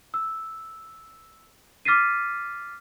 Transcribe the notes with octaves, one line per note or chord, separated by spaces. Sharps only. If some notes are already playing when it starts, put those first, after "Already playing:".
E6
D6 F6 A6 B6 C7 D#7